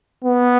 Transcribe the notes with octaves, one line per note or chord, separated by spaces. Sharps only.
B3